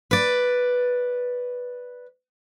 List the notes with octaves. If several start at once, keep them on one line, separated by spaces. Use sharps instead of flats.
B4 D5